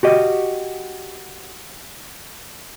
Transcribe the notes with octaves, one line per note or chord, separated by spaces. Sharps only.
F#4 G4 D#5